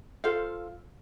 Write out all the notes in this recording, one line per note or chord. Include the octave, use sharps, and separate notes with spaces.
F4 A4 C5 F5